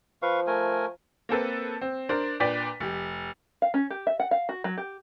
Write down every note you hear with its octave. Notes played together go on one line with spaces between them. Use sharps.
F3 B4 F5 C#6
A3 A#4 G#5
A#3 C4 A4 B4
C4
D4 A#4 C5
A#2 D4 B4 D5 G5 B6
F1 G4
F5
C#4
G4
E5
F#5
F5
F#4
F#3
G4